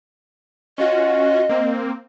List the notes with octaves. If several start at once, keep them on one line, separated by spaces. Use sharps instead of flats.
C#4 F4 F#4 D#5
A#3 C4